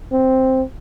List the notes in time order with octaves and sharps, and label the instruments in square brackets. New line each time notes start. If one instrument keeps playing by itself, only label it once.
[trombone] C4